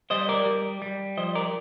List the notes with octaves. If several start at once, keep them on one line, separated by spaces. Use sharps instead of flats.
G3 C5 D#5
A#4 D5
G3
G3
F3 C5 D#5
A#4 D5